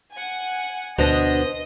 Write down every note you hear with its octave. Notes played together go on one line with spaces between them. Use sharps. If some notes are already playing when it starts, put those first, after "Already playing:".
F#5 G#5
D2 B2 B3 D4 C5 D#5 A#6